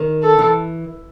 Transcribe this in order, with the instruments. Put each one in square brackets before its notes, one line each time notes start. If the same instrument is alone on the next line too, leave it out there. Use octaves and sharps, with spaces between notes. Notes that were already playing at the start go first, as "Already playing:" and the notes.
Already playing: [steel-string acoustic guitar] D#3
[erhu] A4
[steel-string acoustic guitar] E3